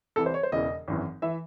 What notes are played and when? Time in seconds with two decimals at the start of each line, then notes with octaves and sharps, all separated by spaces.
0.16 C2 C3 E3 A4
0.26 C5
0.34 C#5
0.43 C5
0.52 E1 E2 C#3 E3 D#5
0.88 G#1 F#2 E3
1.22 E3 E5